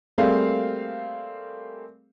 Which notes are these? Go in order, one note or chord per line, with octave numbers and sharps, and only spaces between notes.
G3 A3 A#3 C4 G#4 F5